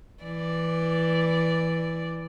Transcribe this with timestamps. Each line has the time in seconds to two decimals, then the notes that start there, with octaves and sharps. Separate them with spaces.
0.23 E3 D5